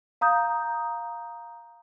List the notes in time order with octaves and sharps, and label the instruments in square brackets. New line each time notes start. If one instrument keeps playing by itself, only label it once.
[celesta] F5 A#5 D#6 G6